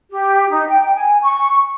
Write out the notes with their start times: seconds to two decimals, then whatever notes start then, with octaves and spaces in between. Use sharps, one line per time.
0.11 G4
0.50 D#4
0.69 G5
0.95 G#5
1.23 C#6